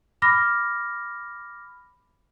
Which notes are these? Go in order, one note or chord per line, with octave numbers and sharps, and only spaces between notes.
B5 D6 F6 A#6